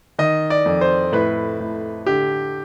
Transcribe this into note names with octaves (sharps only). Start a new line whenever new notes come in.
D#3 D#5
D5
F2
C5
A2 B4
A2
D3 G4